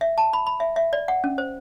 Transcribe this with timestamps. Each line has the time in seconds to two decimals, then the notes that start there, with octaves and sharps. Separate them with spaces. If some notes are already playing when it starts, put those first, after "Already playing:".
0.01 E5
0.18 A5
0.33 B5
0.47 B5
0.60 E5
0.76 E5
0.93 D5
1.08 F#5
1.24 C#4
1.38 C5